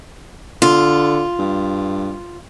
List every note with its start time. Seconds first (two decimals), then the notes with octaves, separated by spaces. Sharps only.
0.62 D3 F4
1.39 G2